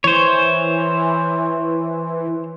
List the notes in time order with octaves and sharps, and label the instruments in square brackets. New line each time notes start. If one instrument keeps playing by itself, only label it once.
[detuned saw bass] E3 [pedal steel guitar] C5 C#5